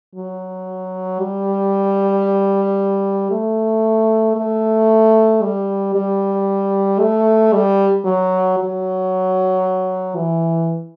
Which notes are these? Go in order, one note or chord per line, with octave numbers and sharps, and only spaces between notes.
F#3
G3
A3
A3
G3
G3
A3
G3
F#3
F#3
E3